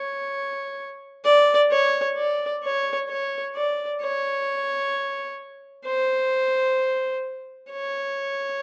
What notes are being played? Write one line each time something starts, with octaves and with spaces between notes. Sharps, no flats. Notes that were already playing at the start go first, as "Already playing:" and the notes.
Already playing: C#5
D5
C#5
D5
C#5
C#5
D5
C#5
C5
C#5